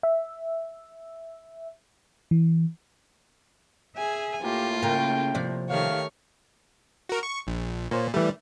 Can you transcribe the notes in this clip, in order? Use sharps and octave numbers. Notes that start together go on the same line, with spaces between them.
E5
E3
G#4 E5 G#5
A2 A#3 F4 G4
C#3 A#4 G5
C3 F3 D5
D#3 A3 G4 C#5 F5 F6
F#4 A#4
C#6
A#1
A#2 A#3 C5 C#5
E3 G3 A3